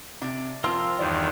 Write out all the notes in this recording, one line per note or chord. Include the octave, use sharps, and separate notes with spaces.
C3 D4
F3 C4 F4 A#4 C6
E2 G2 D#3 D5